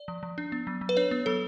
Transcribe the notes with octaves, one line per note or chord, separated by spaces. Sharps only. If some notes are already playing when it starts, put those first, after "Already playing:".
Already playing: D5
F3
F3
D4
B3
F#3
F#3
B4
D4 C#5
B3
F#3 A4